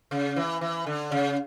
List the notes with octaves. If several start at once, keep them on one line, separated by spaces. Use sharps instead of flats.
C#3
E3
E3
D3
C#3